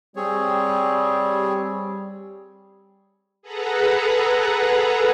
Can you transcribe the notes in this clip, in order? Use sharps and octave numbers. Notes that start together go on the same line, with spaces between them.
G3 C4 G#4 C#5
G#4 A4 B4 F#5 A#5